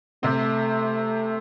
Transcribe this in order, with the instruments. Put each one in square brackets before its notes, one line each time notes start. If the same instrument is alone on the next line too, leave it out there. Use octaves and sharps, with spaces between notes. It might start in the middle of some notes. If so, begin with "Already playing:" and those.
[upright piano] C3 C4 [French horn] A3